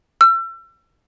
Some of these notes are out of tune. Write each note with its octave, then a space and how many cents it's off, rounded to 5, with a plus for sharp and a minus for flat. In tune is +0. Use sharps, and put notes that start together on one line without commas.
E6 +35